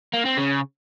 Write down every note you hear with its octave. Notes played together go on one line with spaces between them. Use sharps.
A#3
C4
C#3